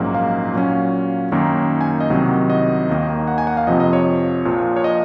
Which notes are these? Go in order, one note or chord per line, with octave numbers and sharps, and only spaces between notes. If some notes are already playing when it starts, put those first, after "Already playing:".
Already playing: A#1 G#2 F#3 A#3 C#4
F5
A#2 F#3 C#4
F#2 D#3 A#3 C#4
G#5
D#5
C2 C3 D#3 F#3
D#5
D#2 D#3 A#3 D#4
F#5
G#5
F#5
F5
F2 C3 F3 D#5
D#5
C#5
A#1 A#2 F3
C#5
D#5